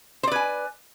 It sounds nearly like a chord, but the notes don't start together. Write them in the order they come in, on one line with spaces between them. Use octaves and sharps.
C5 D5 B4 G#5